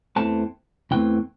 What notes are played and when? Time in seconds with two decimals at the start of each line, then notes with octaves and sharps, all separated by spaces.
0.16 E2 E3 A3 C4 A5
0.91 E2 E3 A3 C4 G5